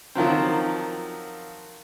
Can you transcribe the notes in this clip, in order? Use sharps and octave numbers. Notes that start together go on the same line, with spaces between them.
D#3 F3 F#3 C4